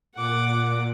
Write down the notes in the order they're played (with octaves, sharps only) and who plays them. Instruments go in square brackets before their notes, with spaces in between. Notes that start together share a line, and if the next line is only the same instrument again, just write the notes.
[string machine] A#2 [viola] F#5 D6